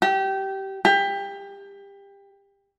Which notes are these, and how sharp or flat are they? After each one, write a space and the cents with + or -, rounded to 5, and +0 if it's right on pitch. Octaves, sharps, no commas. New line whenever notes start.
G4 -20
G4 +25